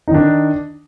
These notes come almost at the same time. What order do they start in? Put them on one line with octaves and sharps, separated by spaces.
D#4 D#3 D4